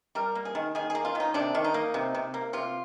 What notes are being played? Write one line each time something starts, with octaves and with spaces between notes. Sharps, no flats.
G3 A#4
A#3
G#4
D#3
D#3 G#4
G#4
A#3
F4
D#3 D#4
C3 D4
D#3
D#4
A#3
C3
C3
A#3
C3 F4